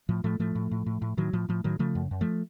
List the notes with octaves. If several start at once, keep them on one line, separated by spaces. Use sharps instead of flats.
A2 F3
A2 F3 A3
A2 F3 A3
A2
A2
A2
A2
A2 D#3 F#3
A2 F3
A2 F3
A2 D#3 F#3
C#3 F3 A3
F#2
F#2
F3 A3